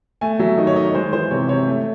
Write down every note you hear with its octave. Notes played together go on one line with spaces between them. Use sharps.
A3 G#5
F#3 E5
D#3 D#5
C#5
D#3 D#5
C#5
G#3 C5
E3 C5
C3 C#5
C3 C#5
A3